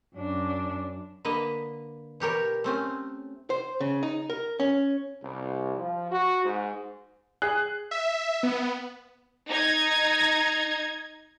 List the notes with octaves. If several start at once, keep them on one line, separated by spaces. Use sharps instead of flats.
F#2 D4
D3 A#3 B4 D#5
B2 G4 A#4 C#5
A3 C4 C#4
C5
C#3
D#4
A#4
C#4
C2
F3
F#4
G#2
G#4 F#6
E5
B3
D#4 G#6